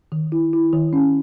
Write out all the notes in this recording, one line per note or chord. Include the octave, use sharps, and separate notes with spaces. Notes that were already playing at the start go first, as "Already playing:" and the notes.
D#3
E4
E4
D#3
C#4